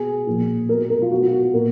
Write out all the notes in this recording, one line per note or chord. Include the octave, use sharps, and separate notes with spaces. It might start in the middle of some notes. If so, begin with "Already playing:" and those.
Already playing: B2 G#4
A#2 F3
B2 A#4
A#4
F4
B2 F#4
F4
F#4
A#2 A#4